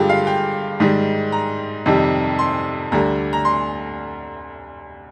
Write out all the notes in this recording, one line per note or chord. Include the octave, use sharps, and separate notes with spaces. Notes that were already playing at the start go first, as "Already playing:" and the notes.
Already playing: G2 D3 G#3 F4 G4
F5
G5
G#2 D#3 G3
A#5
F2 C3 D#3 G3
C6
D2 D3 G3 A#5
A#5
C6